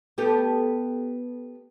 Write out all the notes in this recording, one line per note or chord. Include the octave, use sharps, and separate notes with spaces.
B3 G4 A4